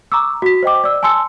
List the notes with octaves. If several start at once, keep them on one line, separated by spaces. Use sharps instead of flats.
A#5 C#6 D6 E6
F#4 B6
C5 D#5 G5 D6
D5 E6
G#5 A5 C6 E6 C#7